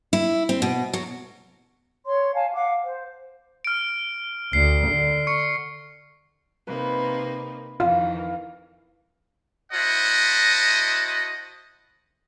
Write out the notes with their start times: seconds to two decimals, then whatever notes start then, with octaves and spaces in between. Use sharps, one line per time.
0.13 E4
0.49 C4
0.62 B2
0.94 F#3
2.05 C#5 C6
2.34 F5 G#5 A5
2.54 F5 F#5 D6
2.83 C5
3.65 F6 D7
4.53 D2 C7
4.87 D3
5.27 C#6 C#7
6.67 C3 A#3 D#4 B4
7.80 F2 D#3 E3 F4 F5
9.72 E4 F#4 C5 D#5 F#5 A5